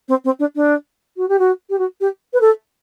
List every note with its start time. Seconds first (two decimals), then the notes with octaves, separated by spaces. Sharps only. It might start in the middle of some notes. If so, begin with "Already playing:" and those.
0.08 C4
0.24 C4
0.39 D4
0.55 D4
1.17 F#4
1.28 G4
1.39 F#4
1.69 G4
1.78 F#4
2.00 G4
2.33 B4
2.41 A4